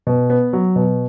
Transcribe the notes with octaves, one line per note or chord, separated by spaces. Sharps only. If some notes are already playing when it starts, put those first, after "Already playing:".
B2
B3
F#3
B2